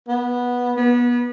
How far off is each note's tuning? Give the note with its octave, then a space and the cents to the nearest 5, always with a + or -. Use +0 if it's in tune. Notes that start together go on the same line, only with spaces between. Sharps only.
B3 -10
B3 -30